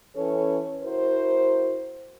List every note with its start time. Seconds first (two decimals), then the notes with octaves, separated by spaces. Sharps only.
0.15 E3 C#4 A4 B4 C#5
0.83 E4 F#4 A#4 C5